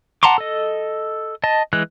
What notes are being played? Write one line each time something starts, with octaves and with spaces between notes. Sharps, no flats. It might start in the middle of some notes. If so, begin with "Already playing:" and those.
F#5 A5 A#5 C6 D6
A4 D#5
D#5 A5
E3 G#3 F#6